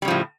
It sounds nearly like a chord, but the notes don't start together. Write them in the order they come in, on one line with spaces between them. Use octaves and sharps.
G3 C#3 F3 A2